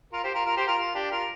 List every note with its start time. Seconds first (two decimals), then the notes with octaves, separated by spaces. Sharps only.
0.13 F4 A#4
0.23 G4 C5
0.34 F4 A#4
0.46 F4 A#4
0.57 G4 C5
0.67 F4 A#4
0.78 F4
0.95 D4 G4
1.11 F4 A#4